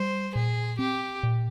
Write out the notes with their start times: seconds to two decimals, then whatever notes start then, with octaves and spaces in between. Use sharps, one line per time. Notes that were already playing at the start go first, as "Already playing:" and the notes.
Already playing: G3 C5
0.35 A#2 G#4
0.79 C4 G4
1.23 A#2